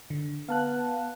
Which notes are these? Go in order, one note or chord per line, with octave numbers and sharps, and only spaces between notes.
D3
B3 F5 A5 F#6